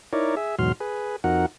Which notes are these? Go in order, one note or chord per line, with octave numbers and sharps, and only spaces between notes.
D#4 E4 A#4 C#5 D5
G#4 E5
E2 G#2 B2 F#3 C6 F6
G#4 B4
F2 D#4 F#4 A#4 F#5